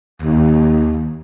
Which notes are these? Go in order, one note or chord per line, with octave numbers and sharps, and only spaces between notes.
D#2